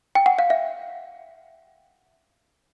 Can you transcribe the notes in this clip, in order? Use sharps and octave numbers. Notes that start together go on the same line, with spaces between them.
G5
F#5
F5
E5